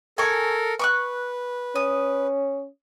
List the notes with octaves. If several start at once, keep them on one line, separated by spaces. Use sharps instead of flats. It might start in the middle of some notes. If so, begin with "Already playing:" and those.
A4 A#4 G#5 C#6
B4 C#6 D6 F#6
C#4 D#6